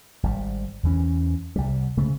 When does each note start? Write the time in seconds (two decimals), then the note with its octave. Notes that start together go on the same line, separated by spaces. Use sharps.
0.23 G#1 G3
0.83 E2 E3 C#4
1.56 C2 G3
1.97 C#3 G#3 A3 C4